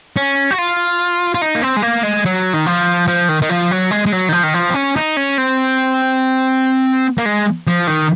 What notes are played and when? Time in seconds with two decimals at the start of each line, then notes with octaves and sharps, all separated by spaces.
0.16 C#4
0.51 F#4
0.58 F4
1.35 F4
1.41 D#4
1.56 A#3
1.63 C4
1.76 G#3
1.82 A#3
2.03 G#3
2.25 F#3
2.53 D#3
2.66 F3
3.07 F3
3.29 D#3
3.42 D#3
3.50 F3
3.71 F#3
3.91 G#3
4.06 G#3
4.12 F#3
4.29 D#3
4.32 F3
4.43 D#3
4.54 F3
4.70 C4
4.74 C#4
4.96 D#4
5.17 C#4
5.38 C4
7.18 A#3
7.26 G#3
7.67 F3
7.87 D#3